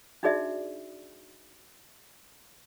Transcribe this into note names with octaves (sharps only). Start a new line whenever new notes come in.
D4 D#4 F#4 G#4 D5 E5